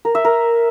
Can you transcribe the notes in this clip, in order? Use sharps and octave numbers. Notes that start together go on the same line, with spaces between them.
A#4
E5
A#4